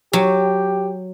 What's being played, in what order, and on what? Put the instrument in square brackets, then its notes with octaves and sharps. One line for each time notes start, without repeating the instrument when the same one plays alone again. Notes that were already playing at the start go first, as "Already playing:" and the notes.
[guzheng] F#3 [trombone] G4